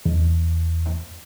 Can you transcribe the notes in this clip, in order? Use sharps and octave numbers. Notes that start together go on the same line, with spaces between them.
E2